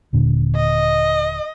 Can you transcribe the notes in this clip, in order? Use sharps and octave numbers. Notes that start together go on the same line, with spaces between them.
D#1 A#2 D3
D#5